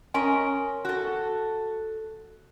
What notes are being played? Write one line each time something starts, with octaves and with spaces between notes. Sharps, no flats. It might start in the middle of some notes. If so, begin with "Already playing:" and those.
C#4 A#4 D#5 G#5 C6
F#4 A4